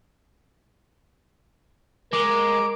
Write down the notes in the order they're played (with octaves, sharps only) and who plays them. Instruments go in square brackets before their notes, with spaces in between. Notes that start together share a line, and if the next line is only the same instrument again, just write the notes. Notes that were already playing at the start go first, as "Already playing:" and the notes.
[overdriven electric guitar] G#3 [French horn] A#4 [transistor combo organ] D6